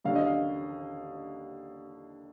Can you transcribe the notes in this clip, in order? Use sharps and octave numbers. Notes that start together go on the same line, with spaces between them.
D#2 D3 F5
D#5
F5